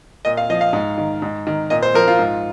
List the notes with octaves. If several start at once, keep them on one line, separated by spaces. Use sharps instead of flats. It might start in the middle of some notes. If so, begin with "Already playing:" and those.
A#2 D#5
F5
F3 D#5
F5
G#2
D#3
G#2
D#3
A#2 D#5
C5
F3 A#4
F4
G#2